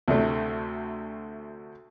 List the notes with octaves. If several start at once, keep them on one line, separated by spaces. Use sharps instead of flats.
D2 C3 A3